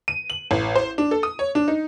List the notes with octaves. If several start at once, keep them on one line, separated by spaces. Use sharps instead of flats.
D#7
F#7
A1
C5
D4
A4
D#6
C#5
D4
D#4